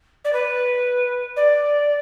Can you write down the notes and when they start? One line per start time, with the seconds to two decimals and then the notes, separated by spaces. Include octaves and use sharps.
0.24 D5
0.33 B4
1.36 D5